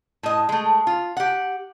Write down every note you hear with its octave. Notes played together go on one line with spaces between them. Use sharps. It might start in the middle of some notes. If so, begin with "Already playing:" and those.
A2 D#5
G#3 A3
F4
G4 F#5